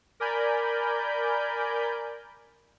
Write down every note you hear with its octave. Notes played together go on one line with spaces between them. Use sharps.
A#4 D5 G#5 B5 G6